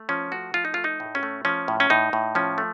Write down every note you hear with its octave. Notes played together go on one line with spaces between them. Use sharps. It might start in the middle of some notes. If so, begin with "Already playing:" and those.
Already playing: A3
F3 C#4
A3 F#4
F3 F4
D#4
A3 F4
D#4
A2
C#4
A3
F3 C#4
A2
C#4
A2 D#4
A2
F3 C#4
A3